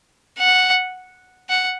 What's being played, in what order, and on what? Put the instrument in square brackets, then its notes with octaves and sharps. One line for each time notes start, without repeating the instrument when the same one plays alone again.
[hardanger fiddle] F#5
F#5